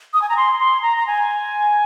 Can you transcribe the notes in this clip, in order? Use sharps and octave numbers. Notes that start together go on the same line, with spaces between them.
D#6
G#5
A#5
C6
C6
A#5
A#5
G#5